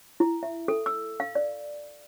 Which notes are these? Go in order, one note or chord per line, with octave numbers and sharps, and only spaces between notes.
E4
E5
A4
E6
F5
D5